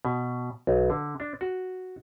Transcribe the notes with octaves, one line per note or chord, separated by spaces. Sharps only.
B2
B1
D3
D4
F#4